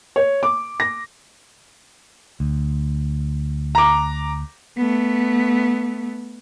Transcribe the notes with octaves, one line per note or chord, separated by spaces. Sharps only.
C#5
D6
A#6
D2
A#5 D6
A3 B3